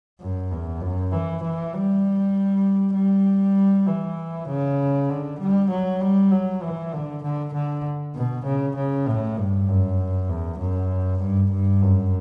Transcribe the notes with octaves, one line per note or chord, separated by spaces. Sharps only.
F#2
E2
F#2
E3
E3
G3
G3
E3
C#3
D3
G3
F#3
G3
F#3
E3
D3
D3
D3
B2
C#3
C#3
A2
G2
F#2
E2
F#2
G2
G2
F#2